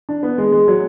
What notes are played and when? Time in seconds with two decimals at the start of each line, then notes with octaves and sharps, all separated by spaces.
0.09 D4
0.23 B3
0.38 G#3
0.52 G#3
0.68 F#3